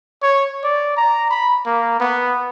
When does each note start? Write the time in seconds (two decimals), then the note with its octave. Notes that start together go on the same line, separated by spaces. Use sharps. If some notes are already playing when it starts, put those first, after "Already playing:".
0.23 C#5
0.64 D5
0.97 A#5
1.30 B5
1.66 A#3
2.00 B3